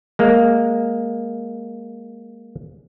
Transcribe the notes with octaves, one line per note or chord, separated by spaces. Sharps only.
G#3 A#3